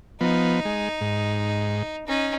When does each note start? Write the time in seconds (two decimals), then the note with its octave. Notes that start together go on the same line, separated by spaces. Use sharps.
0.21 F3 B3 D#4
0.65 G#3
1.01 G#2
2.07 C#4 D#4